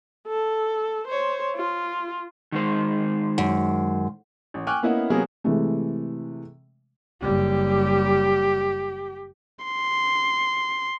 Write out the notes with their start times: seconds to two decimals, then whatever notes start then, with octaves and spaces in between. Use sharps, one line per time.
0.27 A4
1.08 C5 C#5
1.55 F4
2.52 D#3 G#3 C5
3.38 F#2
4.54 A1
4.67 G5 G#5 C#6 D6 F6 F#6
4.83 A#3 B3 C#4 E4 D#5 F#5
5.10 C3 F#3 A#3 B3 G#4 A#4
5.44 C3 E3 G#3 A3
7.22 F#1 G3 G4
9.65 C6